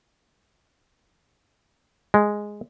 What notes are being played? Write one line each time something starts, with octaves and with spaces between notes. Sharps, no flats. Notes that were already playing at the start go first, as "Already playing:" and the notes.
G#3